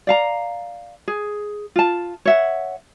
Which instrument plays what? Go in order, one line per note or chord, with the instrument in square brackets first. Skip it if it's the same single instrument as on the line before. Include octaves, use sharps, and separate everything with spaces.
[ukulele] D5 F5 A#5
G#4
F4 A5
C#5 E5 F#5